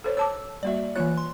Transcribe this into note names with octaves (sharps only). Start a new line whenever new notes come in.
A4 C5 C#5
C#5 A5 D6 E6
G3 A#3 F#4 D5 E5
E3 A#3 F4 C#5 F#6
C6